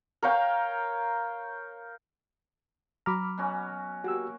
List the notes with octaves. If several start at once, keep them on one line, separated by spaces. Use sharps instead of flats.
A#4 C#5 F5 G5
F#3 A#5 B5 D6 F6
B2 C#4 F#4
A#3 F#4 G4 E6